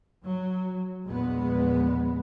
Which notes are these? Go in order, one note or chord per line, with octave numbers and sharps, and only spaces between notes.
F#3
A#1 E2 G#3 B3